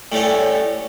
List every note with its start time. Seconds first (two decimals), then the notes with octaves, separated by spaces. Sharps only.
0.12 A2 G3 A3 C#4